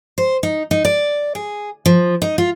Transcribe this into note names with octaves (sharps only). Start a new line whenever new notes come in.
C5
D#4
D#4
D5
G#4
F3
D#4
F4